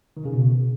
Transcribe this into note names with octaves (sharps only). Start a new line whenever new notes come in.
D#3
C#3
B2